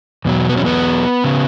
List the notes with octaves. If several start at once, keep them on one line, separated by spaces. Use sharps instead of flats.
E2 B2 F#3
B3
C#4
B3
C#3